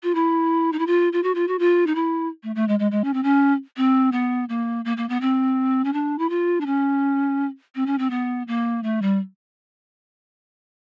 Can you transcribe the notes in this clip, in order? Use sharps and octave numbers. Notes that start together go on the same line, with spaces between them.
F4
E4
D#4
E4
F4
F4
F#4
F4
F#4
F4
D#4
E4
A3
A3
G#3
G#3
G#3
C#4
C4
C#4
C4
B3
A#3
A#3
A#3
B3
C4
C#4
D4
E4
F4
D4
C#4
C4
C#4
C4
B3
A#3
A3
G3